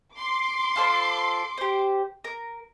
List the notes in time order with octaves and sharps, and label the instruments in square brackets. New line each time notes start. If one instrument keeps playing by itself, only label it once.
[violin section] C6 D6
[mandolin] F4 A4 C5
G4 C5
A#4